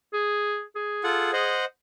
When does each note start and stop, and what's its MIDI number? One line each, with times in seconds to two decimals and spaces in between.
0.13 0.63 68
0.76 1.56 68
1.04 1.31 65
1.04 1.31 69
1.04 1.31 78
1.33 1.65 72
1.33 1.65 75
1.33 1.65 78